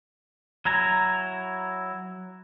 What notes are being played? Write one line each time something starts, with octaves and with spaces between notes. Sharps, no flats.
F#3 E4 G#5 A#5